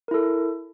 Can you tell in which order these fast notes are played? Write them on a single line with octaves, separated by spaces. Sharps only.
A#4 E4 A4